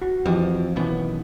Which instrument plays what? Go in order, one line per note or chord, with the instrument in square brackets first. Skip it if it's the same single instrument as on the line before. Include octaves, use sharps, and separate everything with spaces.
[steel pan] F#4
[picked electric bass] F2 [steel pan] E3 F3 G4
[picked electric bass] B1 D#3 B3 [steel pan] E3 C#4